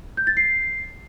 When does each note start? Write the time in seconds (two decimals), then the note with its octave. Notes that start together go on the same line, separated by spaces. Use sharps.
0.17 G6
0.27 A6
0.37 C7